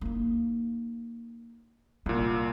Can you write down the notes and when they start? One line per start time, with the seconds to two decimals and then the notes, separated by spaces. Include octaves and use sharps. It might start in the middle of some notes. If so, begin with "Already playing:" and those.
0.01 A#3 D#4
2.06 C2 A#2 F4